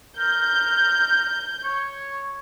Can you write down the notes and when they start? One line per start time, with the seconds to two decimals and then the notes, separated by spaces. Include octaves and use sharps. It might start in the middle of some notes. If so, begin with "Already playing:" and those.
0.17 A#4 G6
1.64 C#5